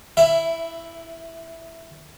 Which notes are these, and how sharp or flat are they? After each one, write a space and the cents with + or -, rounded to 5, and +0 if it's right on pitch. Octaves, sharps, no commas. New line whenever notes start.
E4 +0 E5 +20